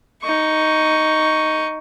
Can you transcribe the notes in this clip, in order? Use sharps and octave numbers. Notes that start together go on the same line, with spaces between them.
D#4 C#6